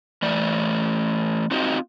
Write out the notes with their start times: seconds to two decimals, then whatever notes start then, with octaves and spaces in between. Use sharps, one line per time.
0.22 E3 A3 D5
1.51 C4 D#4 F4 F#4 D#5